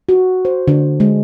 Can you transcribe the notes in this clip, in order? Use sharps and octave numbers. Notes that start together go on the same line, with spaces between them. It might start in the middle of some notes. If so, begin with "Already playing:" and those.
F#4
C5
D3
G#3